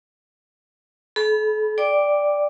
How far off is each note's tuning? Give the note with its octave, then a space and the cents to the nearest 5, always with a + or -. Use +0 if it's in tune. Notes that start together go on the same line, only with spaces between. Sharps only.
A4 -40 B5 -10
D5 +0 G5 +10 D6 +0